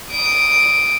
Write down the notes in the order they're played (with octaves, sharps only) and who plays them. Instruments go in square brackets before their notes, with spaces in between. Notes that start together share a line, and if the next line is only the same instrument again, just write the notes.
[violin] D#6 D7